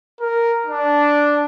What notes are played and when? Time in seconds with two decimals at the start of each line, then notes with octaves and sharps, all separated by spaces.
0.20 A#4
0.67 D4